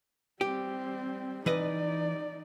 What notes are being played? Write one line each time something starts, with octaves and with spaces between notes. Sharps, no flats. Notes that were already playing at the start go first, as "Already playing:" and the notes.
G3 C4 G4
E3 D#4 B4 D5 D#5